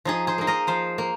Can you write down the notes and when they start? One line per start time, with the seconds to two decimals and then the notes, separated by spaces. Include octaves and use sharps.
0.05 F3 D#4 G#4
0.27 G#4 C5
0.38 A#3 D#4
0.47 A#4 D#5
0.67 F3 C5 F5
0.98 A#3